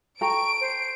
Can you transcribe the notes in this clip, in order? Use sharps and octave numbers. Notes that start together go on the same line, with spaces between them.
A4 G5 A#5 C#6 D7
C5